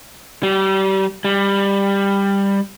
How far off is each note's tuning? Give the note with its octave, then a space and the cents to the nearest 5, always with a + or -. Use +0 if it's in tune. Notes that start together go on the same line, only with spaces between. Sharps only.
G3 -30
G3 +15